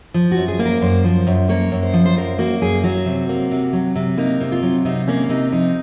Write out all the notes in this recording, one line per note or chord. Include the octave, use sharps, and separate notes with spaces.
F3
F#4
F#2
G#4
A#3
A#4
F#2 C5
F3
F#2
A#3 C#5
F#2
C5
F3
C5
F#2 A#4
A#3 F#4
F#2 G#4
F#3 F#4
C3
A#3
C3
F#3
C3
A#3 D#4
C3
F4
F#3
C3 D#4
A#3 C#4
C3 D#4
F3 D#4